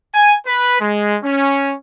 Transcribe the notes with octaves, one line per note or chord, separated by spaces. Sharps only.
G#5
B4
G#3
C#4